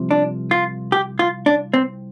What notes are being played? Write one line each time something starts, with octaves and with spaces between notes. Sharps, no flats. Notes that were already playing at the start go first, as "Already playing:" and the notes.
Already playing: C2 C3 F3
D4
F4
G4
F4
D4
C4